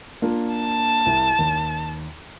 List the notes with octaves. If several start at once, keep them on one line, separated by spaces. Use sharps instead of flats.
A#3 D4 F4
A5
C2
D#2